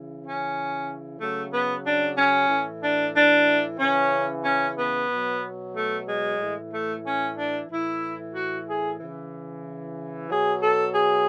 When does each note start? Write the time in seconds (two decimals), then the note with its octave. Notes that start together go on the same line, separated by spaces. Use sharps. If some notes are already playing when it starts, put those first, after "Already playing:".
Already playing: C#3 E3
0.20 C#4
1.18 C#3 F#3 A3
1.51 B3
1.84 D4
2.15 C#4
2.48 A2 E3
2.80 D4
3.14 D4
3.78 C#3 E3 C#4
4.43 C#4
4.76 B3
5.08 B2 F#3
5.73 A3
6.06 G#3
6.38 A2 E3
6.70 A3
7.04 C#4
7.36 D4
7.68 A2 E3 E4
8.33 F#4
8.66 G#4
8.98 C#3 E3
10.29 B2 F#3 G#4
10.61 A4
10.93 G#4